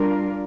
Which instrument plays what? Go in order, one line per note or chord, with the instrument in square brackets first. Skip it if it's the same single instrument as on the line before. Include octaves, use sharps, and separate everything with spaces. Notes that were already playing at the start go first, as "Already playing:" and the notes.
Already playing: [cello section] G3 D4 F4 A#4